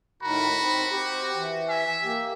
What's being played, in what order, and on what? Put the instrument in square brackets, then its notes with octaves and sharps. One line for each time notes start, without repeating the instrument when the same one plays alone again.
[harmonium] A2 D#3 A#4 [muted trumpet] F#4 [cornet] B5
[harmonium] C4 D#4
[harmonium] C4 [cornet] G4
[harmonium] E3
[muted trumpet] E5 [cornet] G#5
[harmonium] A#3 [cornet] G4